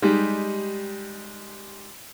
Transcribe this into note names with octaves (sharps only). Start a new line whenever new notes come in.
G3 G#3 D#4 G4